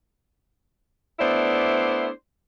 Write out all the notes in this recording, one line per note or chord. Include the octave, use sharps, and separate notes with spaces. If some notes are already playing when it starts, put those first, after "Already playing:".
A3 B3 D4 E4 C5 D5